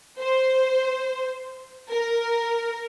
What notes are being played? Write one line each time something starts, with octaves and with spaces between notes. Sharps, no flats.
C5
A#4